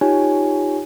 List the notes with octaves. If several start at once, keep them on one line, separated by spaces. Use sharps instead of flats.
D#4 F4 G4 C#5 G#5